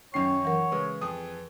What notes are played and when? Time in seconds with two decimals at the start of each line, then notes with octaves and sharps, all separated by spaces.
0.14 F#2 D#3 F#3 C#4 C#5 G5 C7
0.45 E3 A#4 F#5
0.72 C#3 G#3 B4
1.01 F2 G#4 D#6